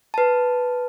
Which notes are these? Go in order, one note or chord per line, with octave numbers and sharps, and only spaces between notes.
B4 A5